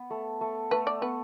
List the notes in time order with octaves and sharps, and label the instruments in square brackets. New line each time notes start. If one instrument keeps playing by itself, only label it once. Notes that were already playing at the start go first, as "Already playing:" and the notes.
Already playing: [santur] B3
A3
A3
[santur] A3 [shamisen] B4
[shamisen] D5
[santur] B3 [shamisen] B4